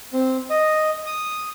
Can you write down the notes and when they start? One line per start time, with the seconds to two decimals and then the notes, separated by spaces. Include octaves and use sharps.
0.13 C4
0.50 D#5
1.06 D#6